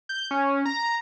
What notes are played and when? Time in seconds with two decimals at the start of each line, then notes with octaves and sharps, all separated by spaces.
0.09 G6
0.31 C#4
0.66 A#5